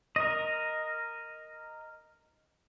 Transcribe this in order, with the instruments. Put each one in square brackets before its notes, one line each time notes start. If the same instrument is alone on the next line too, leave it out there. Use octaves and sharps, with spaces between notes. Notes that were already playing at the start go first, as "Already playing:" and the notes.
[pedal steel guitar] A#4 D#5